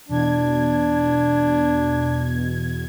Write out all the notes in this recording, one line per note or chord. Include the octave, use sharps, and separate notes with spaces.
E2 B2 D4 G#6